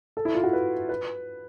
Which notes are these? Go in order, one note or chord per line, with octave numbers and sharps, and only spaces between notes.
A4
E4
F4
F#4
B4
B4